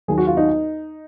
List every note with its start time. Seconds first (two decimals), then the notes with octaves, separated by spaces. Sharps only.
0.08 D#2 D#3 F#3 G#4
0.18 F#4
0.27 F4
0.37 D#4